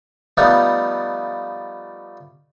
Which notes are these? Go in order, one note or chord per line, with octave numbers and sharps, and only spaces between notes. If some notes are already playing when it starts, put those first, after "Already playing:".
F3 G3 A3 B3 D#4